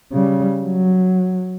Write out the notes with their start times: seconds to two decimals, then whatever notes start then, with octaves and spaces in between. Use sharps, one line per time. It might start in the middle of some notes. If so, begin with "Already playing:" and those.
0.12 C#3 G3
0.64 F#3